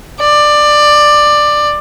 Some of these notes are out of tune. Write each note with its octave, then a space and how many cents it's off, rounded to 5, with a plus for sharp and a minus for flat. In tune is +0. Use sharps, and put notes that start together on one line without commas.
D5 +15